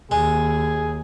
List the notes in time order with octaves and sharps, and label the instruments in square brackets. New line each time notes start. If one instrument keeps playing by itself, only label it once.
[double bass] D#2 [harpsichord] G#3 [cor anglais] G#4